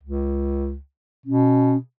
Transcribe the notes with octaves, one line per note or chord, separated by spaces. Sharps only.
C#2
B2 C#4